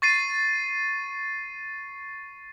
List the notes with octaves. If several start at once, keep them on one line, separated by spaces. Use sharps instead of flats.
C#6 A6 C7 D#7